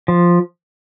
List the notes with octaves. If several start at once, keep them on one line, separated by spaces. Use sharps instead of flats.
F3